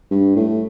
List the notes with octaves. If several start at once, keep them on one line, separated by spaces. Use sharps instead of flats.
G2
A2